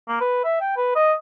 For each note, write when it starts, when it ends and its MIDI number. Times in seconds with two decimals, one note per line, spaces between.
0.08 0.17 58
0.21 0.40 71
0.44 0.58 76
0.61 0.72 79
0.77 0.93 71
0.95 1.13 75